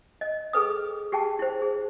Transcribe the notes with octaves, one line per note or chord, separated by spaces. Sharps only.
D#5
G#4 A4 B4 D#6
G4 G#4 G5 A5
E4 C5
G#4